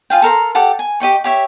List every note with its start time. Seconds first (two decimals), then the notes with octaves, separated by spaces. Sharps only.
0.10 F4 G#4 F5 G5
0.22 A4 A#4 A#5 C6
0.55 G4 A4 F#5
0.79 G#5
1.00 G4 D#5 G5 C#6
1.24 G4 C#5 E5